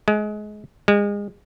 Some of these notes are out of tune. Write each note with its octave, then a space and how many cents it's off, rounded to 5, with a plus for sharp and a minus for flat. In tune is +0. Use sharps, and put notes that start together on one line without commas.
G#3 +25
G#3 -30